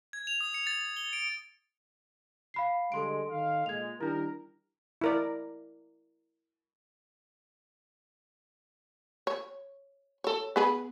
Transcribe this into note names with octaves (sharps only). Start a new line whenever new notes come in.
G#6
F7
D#6
C#7
A6
A6
G7
D7
F5 B5 C7
D3 G3 G#3 A4 C6 D7
D#3 F5
A#2 G#3 G#6 F7
D#3 G3 D4 E4 A#4
E4 A#4 D5
C#5
A4 C#5
B3 G#4 B4